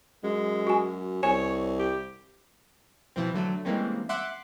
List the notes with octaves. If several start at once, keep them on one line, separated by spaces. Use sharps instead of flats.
F#2 G#3
F#4 G#5
C2 C#5 G#5
G4
B2 E3 F3 C4
D3 F#3 A3
E3 G3 G#3 A#3 C4 C#4
E5 F#5 C6 D6 F#6